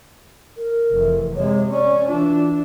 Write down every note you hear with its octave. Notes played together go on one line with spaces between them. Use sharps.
A#4
F1 E3
C3 G#3 C#5
C#4 D5
E3 D4 F4